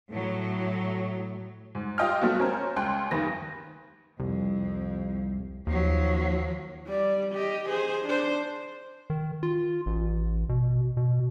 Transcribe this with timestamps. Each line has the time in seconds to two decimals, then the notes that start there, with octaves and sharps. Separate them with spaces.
0.11 A2 F#3
1.75 G#2
1.98 F4 G4 D#5 G5 C6 F6
2.21 F#3 A3 B3 F#4
2.40 C#4 A#4 C5
2.76 C#2 G5 C6 F#6
3.11 D2 G2 D#3 B4 A#6
4.20 C2 F2
5.67 D#2 F3 F#3
6.87 G3 D5
7.32 G4 D#5
7.69 G#4 C5
8.05 D4 C5
9.10 D#3
9.43 F4
9.86 A1
10.49 B2
10.97 B2